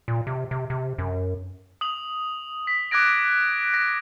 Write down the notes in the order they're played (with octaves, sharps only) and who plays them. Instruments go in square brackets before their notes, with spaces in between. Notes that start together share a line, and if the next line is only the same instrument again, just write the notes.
[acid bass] A#2
C3
C3
C3
F#2
[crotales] D#6 F#7
B6
D6 F#6 G#6 A#6 D7
A#6